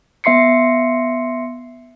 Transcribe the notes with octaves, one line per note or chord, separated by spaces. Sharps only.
B3 E5 C6 C7 C#7